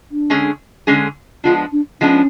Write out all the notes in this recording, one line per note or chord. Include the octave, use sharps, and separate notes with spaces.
D4
D3 G#3 C#4 G#4
D3 G#3 C#4 G#4
F3 G#3 B3 D4 F4
D4
F3 G#3 B3 C#4 D4